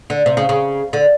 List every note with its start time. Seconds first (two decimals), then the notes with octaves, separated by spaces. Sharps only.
0.10 D3
0.26 C3
0.37 C#3
0.49 C#3
0.93 D3